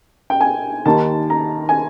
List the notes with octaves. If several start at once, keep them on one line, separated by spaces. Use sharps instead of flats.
G5
G#5
D#2 D#3 A5
A#5
G#5